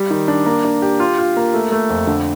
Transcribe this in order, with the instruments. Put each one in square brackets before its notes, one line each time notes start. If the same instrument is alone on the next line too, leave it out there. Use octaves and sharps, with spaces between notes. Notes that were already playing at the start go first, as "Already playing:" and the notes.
Already playing: [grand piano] G3
D#3
D4
A#3
D4
G4
F4
F4
A#3
A3
A3
F2
D3